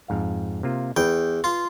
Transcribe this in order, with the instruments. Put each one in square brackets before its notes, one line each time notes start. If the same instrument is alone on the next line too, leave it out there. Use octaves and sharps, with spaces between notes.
[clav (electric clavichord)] F2 G#2 F5
C3 A#3 F4
[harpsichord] E2 G5 [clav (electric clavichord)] B4
[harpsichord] F4